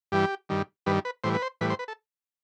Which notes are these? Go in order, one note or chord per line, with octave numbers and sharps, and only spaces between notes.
G2 E3 G3 G4
G2 D#3 G3
G2 D#3 G3 B4
B4
A2 E3 G3 C5
B4
C5
A2 E3 G3 B4
C5
B4
A4